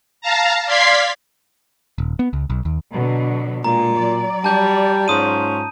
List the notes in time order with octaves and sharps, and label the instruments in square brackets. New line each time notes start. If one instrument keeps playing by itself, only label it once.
[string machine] F5 A5 A#5
D5 F5 C6 G#6 B6 C7
[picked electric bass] D#1
B3
C#2
B1
D#2
[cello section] B2 D3 F#3
[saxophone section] A#2 [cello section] G#3 [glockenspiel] A#5
[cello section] F#3 D5
[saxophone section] G3 [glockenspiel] A5 G6
[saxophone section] G#2 C#4 F4 [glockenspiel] D#6 D#7